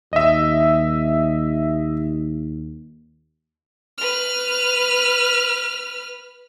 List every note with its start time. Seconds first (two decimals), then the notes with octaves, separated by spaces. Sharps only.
0.13 D#2 D#5 E5
3.98 B4 F6